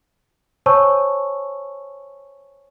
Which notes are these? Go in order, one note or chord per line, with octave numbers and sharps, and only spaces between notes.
C5 C#5 G#5 A5 C#6 E6